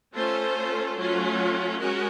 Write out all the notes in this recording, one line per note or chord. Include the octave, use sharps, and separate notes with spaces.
A3 C#4 F4 A4 C5
F#3 A3 C#4 F4
G#3 C#4 F#4 A#4